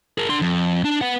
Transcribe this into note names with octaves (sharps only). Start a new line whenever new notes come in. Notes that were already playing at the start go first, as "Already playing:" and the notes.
G#4 A#4
D4 C6
F2
D4
B4 F#5